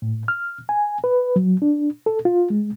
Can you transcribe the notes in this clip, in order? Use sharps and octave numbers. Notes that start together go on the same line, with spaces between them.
A2
F6
G#5
B4
F#3
D4
A4
F4
G#3